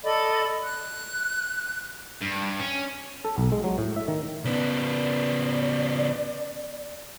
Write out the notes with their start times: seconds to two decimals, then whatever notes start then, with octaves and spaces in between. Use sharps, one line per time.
0.04 A4 D5 D#5 B5
0.65 F#6
2.21 G2
2.60 C#4
3.25 A4
3.38 B1
3.52 G#3
3.64 F#3
3.78 A2
3.96 E5
4.08 D#3
4.45 C#3 B3 D5